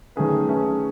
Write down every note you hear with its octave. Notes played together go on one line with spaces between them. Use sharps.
D#3 A3 C#4 G#4 B4
D#3 A3 C#4 G#4 B4